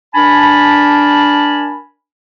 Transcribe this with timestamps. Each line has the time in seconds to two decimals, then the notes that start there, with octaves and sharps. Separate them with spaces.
0.14 D4 A#4 G#5 A5 B5